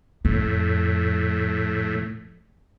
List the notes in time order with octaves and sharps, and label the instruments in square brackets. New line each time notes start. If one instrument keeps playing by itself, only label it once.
[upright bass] F2 [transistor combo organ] A2